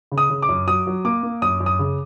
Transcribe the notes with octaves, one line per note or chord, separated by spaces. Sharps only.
C#3
D#6
C#3
D6
F#2
F#3 D#6
F#3
A#3 D6
A#3
F#2 D#6
F#2
D#6
C#3